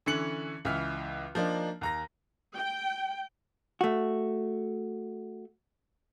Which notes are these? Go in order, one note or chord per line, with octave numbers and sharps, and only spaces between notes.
D3 E3 C#4 C#7 F#7
C#2 E3 E5 F6
F3 A#3 D4 D#4
D#2 A#5 A#6
G5
A3 F#4